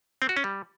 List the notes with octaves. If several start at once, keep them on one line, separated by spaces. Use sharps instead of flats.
C4
F#4
C#4
G3